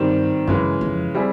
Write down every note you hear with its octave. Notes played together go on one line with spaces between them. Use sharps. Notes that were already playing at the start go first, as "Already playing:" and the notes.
Already playing: G2 D#3 G3 C4
F#2 C#3 E3 G#3
F2
G3 C4 E4 G#4